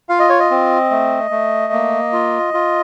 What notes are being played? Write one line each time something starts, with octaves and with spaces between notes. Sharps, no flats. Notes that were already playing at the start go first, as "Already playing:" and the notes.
F4 F5
D#5
C#5
D#5
C4
A3
A3
A#3
F4
F4